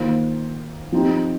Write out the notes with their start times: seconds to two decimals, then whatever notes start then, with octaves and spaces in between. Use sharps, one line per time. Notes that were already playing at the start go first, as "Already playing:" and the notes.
Already playing: D#3 A#3 F4 C5
0.92 F3 C4 D#4 G4